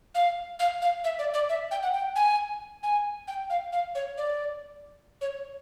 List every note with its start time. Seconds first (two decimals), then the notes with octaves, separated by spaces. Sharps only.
0.15 F5
0.59 F5
0.82 F5
1.04 E5
1.19 D5
1.34 D5
1.49 E5
1.71 G5
1.83 F#5
1.93 G5
2.16 G#5
2.83 G#5
3.28 G5
3.50 F5
3.73 F5
3.95 C#5
4.18 D5
5.21 C#5